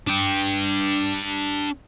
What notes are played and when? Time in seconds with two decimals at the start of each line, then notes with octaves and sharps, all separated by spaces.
0.07 D4 G5